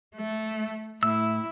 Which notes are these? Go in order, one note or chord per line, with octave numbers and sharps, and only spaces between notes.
A3
A2 E4 E6